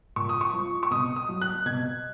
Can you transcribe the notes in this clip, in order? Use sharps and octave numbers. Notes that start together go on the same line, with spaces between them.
A#2 C#6
D#6
C#6
F3
C#6
B2 D#6
D#6
F#3
F#6
B2 G#6